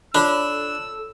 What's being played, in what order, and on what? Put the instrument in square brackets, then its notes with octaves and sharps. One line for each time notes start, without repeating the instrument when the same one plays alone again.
[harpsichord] D4 [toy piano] F4 C#5 B5 [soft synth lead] A4 [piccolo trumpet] E6